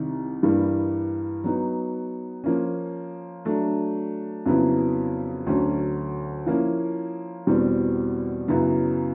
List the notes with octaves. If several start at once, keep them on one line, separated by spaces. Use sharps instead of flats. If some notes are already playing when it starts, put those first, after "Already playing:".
Already playing: C2 C3 D#3
G2 E3 G3 A#3
F#3 B3 D#4
F3 A#3 C#4
F#3 A3 D4
F2 C#3 F#3 B3 E4
D2 D3 F#3 A3 C#4
F3 A#3 C#4 E4
E2 B2 G3 C4
F#2 C#3 F#3 B3 E4